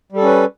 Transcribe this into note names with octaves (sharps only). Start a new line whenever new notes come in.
G3 C#4 A4 B4